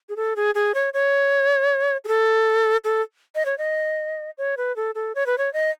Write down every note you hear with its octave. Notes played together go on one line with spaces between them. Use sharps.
G#4
A4
G#4
G#4
C#5
C#5
G#4
A4
A4
D#5
C#5
D#5
C#5
B4
A4
A4
C#5
B4
C#5
D#5